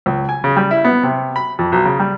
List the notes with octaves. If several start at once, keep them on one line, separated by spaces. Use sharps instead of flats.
C#2
G#5
C#3
G3
E4
B3
C3
B5
F2
B1
C#3
G3